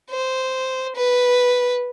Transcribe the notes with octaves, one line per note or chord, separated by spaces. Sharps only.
C5
B4